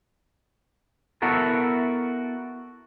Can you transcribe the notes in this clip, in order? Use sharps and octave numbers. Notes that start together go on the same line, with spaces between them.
B3 E4 F#4 A4 A#4